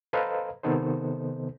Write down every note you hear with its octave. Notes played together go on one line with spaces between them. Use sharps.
A4 B4 C5 D#5 F5 A#5
C3 D#3 B3 D#4 A4 C5